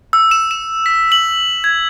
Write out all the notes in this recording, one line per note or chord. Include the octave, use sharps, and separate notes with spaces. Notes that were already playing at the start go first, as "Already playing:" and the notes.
E6
E7
E7
B6
F#7
G#6